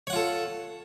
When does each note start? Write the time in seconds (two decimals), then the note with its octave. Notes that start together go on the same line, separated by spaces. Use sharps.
0.07 C#5
0.10 F#5
0.13 F4
0.16 A4